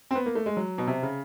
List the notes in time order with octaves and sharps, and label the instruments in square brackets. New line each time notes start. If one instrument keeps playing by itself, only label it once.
[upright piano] C4
B3
A#3
A3
G#3
F#3
B2
C3
C#3